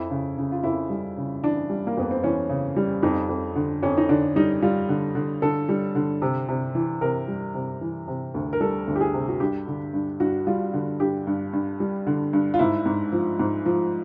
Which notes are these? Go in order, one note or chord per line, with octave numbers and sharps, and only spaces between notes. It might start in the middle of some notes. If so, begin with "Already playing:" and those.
Already playing: F2 E4
C#3
C#3
F4
F2 E4
G3
C#3
E3 D4
G3
A#3
F2 B3
C4
E3 C#4
C#3
G3
F2 D#4
F2
D3
F2 C#4
D#4
D3 D4
G3 D#4
G3 F4
D3
D3
D3 A4
G3
D3
C3
C3
E3
C3 A#4
G3
C3
E3
C3
D2
A#4
G3 A4
D2
G4
G#4
C3
F#4
G2 G4
D3
G2
G2 F#4
G3 F4
D3
G2 G4
G2
G2
G3
D3
G2
F4
G#2 E4
G#2
F3
G#2
F3